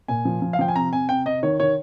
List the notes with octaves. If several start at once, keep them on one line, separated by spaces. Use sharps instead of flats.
A#2 G#5
F3
F3
F5
F3 G5
G#5
C3 A#5
C3 G#5
C3 G5
C3 D#5
D#3 C#5
D#3 C#5